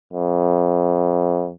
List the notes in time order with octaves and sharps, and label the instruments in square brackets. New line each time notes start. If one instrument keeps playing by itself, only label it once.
[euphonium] F2